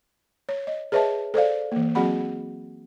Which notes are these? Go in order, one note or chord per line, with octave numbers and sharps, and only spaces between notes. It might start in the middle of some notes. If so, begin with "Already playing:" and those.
C#5
D#5
G#4 B4 C#5 D#5 E5 A5
A4 C5 D5 F5
E3 A#3
F#3 C4 F#4 G#4 F#5 B5